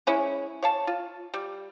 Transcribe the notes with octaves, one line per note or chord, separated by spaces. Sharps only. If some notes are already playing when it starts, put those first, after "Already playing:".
G#3 C#4 E4
C#5 F5 A5
F4
G3